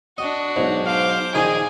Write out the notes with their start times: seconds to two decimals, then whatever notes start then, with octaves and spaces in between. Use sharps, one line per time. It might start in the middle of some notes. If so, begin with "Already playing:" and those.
0.18 D4 F#4 D#5
0.56 B1 G#2
0.86 C5 F5 D6
1.35 A#1 D#3 G#4 G#5 A#5